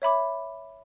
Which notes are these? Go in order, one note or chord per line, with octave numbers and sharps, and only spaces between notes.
C#5 E5 B5 D6